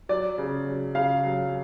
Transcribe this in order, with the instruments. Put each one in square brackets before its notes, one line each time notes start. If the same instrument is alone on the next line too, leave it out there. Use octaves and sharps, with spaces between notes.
[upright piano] F#3 D5
C#3
F#3
C#3 F5
F#3